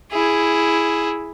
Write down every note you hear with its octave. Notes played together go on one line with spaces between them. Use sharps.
E4 G#4